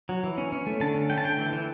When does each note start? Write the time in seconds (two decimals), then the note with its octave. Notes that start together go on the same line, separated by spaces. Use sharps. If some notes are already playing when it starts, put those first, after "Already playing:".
0.09 F#3
0.24 E3
0.38 C#4
0.52 C#4
0.67 A3
0.80 D3 A5
0.95 C#4
1.10 A3 G5
1.18 A5
1.24 D3 G5
1.38 E3
1.53 E3